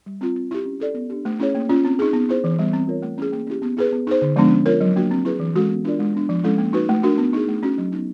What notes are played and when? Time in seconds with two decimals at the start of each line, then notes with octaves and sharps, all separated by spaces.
0.06 G3
0.21 C4 F4
0.36 C4
0.51 E4 G4
0.66 C#4
0.80 E4 A4 D5
0.94 B3
1.10 D4 G4
1.25 A3
1.39 C#4 E4 G#4 C#5
1.55 A#3
1.69 C#4 F4
1.85 C4
1.99 D#4 G#4
2.13 B3
2.29 E4 G#4 C5
2.44 E3
2.59 G3 B3
2.73 C4
2.87 F4 A#4 C#5
3.02 A3
3.18 C#4 E4 G#4
3.32 A#3
3.47 C#4 E4 G4
3.62 B3
3.77 E4 G#4 B4
3.92 B3
4.07 D#4 G#4 C5
4.22 D3
4.36 F3 G#3 B3 D4
4.51 C#4
4.66 F4 A#4 C#5
4.81 F#3
4.96 A#3 D4 F#4
5.11 C4
5.25 E4 G#4 B4
5.40 E3
5.55 G#3 C#4 F#4 A4
5.70 B3
5.85 D4 F4 A#4 D5
5.99 G#3
6.15 B3 D4
6.29 F3
6.44 G#3 C#4 E4 A4
6.58 A#3
6.73 D#4 F#4 B4
6.89 A3
7.03 D4 F#4 A#4
7.18 B3
7.33 D#4 G#4
7.48 A3
7.63 C#4 F#4
7.78 F#3
7.92 B3 D#4